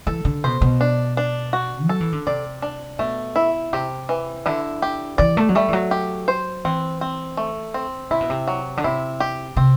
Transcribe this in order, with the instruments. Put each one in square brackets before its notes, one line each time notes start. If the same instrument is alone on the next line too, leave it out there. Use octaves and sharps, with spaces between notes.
[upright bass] E3 [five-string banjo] A4
[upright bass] D3
[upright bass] B2 [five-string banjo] C5
[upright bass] B2
[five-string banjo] D4
D4
F#4
[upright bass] F#3 [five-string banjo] A4
[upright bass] E3
D3
[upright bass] C3 [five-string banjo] D5
[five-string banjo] D4
[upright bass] B2 [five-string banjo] A3
[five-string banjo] E4
[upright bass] C3 [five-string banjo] G4
[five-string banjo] E3
[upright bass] D3 [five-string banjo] E4
[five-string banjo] G4
[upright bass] E3 [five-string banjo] D5
[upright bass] A3
F#3
[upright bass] G3 [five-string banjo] A3
[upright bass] E3
F#3
[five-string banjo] G4
C5
[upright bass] E3 [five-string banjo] C4
[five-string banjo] C4
A3
C4
[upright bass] C3 [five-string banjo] E4
[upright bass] B2
C3
[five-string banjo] F#3
[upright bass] D3
[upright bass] C3 [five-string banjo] E4
[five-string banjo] G4
[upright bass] C3 [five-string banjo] C4